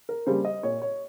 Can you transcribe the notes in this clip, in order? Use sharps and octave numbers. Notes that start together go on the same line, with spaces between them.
A#4
C#3 G3 A#3 C5
D#5
A#2 C#5
C#5